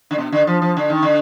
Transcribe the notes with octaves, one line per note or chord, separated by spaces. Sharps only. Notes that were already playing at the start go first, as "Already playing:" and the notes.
D3
B2
D3
F3
F3
D3
D#3
D3